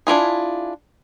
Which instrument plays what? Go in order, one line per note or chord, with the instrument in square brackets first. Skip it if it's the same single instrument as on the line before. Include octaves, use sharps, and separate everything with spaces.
[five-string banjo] D4 E4 F4 G#4